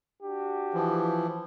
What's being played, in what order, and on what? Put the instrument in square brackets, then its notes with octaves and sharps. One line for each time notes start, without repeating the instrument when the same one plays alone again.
[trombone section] D4 F#4 G4
[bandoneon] E3 F3